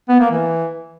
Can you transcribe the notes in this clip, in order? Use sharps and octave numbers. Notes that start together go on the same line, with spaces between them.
B3
A#3
E3